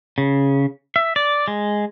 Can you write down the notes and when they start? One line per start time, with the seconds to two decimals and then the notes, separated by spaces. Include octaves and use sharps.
0.18 C#3
0.96 E5
1.16 D5
1.48 G#3